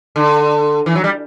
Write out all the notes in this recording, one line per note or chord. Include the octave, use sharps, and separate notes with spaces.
D3
E3
F#3
G3